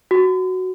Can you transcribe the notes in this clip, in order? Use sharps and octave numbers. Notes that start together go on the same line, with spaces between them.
F#4